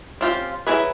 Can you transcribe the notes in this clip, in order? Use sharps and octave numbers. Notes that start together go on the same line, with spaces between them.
C4 C#4 F4 G4
F#3 C4 E4 G#4 B4